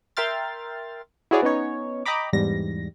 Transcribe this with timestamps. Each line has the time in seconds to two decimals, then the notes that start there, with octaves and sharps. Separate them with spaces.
0.17 A#4 E5 G5 C6 F6 A6
1.31 E4 F#4 G#4 C#5 D5
1.42 B3 C#4 D#4 C#5
2.06 D#5 G5 A#5 B5 D6
2.33 E2 G#2 G3 A#6